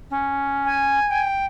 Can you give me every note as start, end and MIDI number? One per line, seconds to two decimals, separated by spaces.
0.10 0.99 61
0.65 1.27 80
1.08 1.45 79